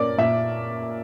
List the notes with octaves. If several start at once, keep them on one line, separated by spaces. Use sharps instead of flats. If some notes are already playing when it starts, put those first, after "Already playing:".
Already playing: A#2 A#3 C#4 D5
A#2 E5